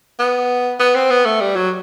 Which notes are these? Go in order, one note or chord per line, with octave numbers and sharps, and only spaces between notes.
B3
B3
C4
B3
A3
G3
F#3